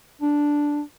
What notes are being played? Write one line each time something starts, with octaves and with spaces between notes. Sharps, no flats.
D4